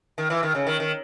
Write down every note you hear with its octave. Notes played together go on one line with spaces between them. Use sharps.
D#3
E3
D#3
C#3
D#3
D#3